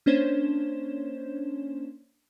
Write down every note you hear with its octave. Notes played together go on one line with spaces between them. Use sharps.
A#3 C#4 D4 C5 C#5 E7